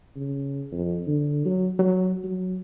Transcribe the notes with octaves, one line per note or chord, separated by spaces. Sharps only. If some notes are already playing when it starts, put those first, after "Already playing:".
C#3
F2
D3
F#3
F#3
F#3